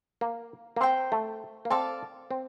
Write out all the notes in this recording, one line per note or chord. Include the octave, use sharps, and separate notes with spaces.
A#3
A#3
C4 C5 G5 A#5
A3
A#3
C4 A4 D5 F5 A5
C4